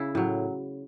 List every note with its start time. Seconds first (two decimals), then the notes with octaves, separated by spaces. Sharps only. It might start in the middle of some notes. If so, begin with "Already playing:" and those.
Already playing: C#3 E4
0.15 A2 F#3